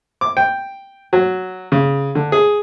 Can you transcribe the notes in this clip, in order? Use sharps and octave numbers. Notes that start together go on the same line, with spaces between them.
D6
G5
F#3
C#3
D3
G#4